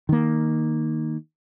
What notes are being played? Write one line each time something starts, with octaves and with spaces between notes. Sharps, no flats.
D#3 A#3